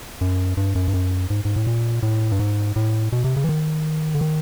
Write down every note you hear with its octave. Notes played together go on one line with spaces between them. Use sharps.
F#2
G2
F#2
G2
F#2
G#2
G#2
A2
A#2
A2
G2
G#2
A2
B2
C3
C#3
E3
D#3
D3
D#3